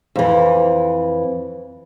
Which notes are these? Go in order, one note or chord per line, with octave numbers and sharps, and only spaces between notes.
F2 E3